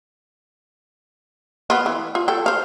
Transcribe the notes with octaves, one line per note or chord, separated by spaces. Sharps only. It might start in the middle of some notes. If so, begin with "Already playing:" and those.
B3 F4
E3
F4
A4 G5
C5 F5